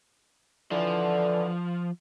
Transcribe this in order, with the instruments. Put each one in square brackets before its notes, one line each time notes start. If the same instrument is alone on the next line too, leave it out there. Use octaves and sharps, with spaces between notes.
[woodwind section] D3 E3 [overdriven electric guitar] F3